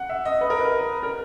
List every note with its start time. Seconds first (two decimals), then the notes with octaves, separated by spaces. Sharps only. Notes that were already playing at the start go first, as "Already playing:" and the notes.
Already playing: F#5
0.09 E5
0.25 D#5
0.41 B4
0.50 A#4
0.59 B4
1.03 A#4